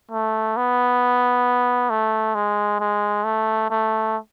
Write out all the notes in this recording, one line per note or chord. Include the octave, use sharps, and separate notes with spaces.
A3
B3
A3
G#3
G#3
A3
A3